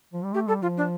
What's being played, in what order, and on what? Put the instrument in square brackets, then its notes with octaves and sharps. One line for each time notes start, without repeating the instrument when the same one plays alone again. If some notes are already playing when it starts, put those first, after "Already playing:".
[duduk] F3
G3
[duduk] A3 [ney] G4
[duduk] G3 [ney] A4
[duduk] F3 [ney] F4
[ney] D4